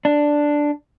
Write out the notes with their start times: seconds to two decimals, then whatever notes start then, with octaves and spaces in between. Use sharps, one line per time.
0.05 D4